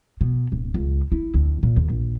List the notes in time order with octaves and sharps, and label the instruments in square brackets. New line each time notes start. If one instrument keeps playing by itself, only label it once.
[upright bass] B2
D1
C#2
E4
D2
A#2
D#2
A#1